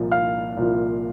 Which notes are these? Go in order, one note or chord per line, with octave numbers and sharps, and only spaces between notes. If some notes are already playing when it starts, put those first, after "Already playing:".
Already playing: C2 A#2 F3
F5 F6
C2 A#2 F3